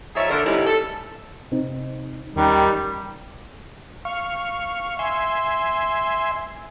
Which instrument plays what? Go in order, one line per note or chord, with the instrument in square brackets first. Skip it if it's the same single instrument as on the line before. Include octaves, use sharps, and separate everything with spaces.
[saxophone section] F3 D#4 G#4 C#5 E5
D3 A4 A#4
C3 G3 A3 C#4 D#4 E4
A4
[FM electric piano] C3 C4 D#4
[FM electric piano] D#2 C#4 F#6 [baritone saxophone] D#3 [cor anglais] G3
[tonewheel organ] F5 C#6
E5 G#5 C6